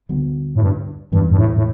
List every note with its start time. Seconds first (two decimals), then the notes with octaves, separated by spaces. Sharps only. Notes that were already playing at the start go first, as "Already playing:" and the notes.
0.09 D2 D3 G3 B3
0.55 A2
0.61 G2
1.12 E2 G2 E3 G3
1.31 G2
1.37 A2
1.56 A2